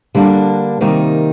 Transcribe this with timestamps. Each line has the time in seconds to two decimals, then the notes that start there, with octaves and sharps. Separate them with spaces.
0.15 D3 G3 A#3 D4
0.81 C3 D#3 G3 A#3 D#4